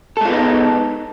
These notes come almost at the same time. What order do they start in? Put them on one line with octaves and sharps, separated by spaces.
A4 G#3 F4 B3 D#4